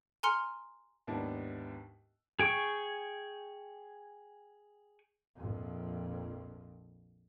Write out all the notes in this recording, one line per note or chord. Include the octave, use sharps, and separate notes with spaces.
G#5 A#5 C6 F6 C#7
D#2 G#2 B3 D4 E4 A5
G#4 G5 G#5 C#6
A#1 F2